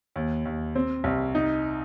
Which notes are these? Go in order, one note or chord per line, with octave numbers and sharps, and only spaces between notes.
D#2
D#2
C4
C2
D#4